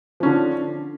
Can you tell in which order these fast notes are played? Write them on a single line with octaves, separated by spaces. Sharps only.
F3 C#4 D3